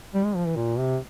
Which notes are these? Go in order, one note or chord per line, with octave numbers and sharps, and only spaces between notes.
G3
G#3
F3
E3
A#2
C3